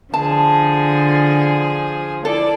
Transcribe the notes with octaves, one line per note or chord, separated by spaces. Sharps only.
D3 F3 G#4 A5
E4 A4 D5